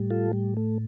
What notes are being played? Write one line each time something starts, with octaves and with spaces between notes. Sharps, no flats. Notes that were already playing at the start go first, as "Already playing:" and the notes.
Already playing: A2 G3
F4 A4
G3
A3